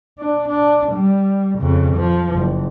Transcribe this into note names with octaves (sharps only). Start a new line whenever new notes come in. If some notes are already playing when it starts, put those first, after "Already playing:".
D4
D4
G3
F2 C#3
F3
F#1